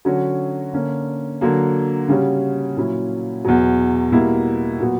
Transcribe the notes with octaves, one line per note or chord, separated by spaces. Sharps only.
D3 F#3 C#4 F#4
D3 A#3 C#4
D3 F#3 A#3
C#3 G3 C#4 F#4
A#2 F#3 C#4 E4
E2 B2 F#3
B2 G3 A#3 E4
A#2 F#3 B3 F#4